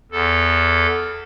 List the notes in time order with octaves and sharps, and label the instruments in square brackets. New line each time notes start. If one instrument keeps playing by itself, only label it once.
[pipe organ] E2 A4